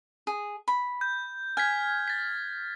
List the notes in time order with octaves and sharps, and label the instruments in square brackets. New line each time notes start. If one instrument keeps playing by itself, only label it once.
[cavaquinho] G#4
B5
[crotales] G6
[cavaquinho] G#5 [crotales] F6 G#6 B6
[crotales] A6 B6